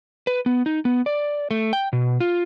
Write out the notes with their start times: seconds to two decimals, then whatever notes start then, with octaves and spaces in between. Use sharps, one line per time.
0.27 B4
0.46 B3
0.66 D#4
0.85 B3
1.06 D5
1.51 A3
1.73 G5
1.93 B2
2.20 F4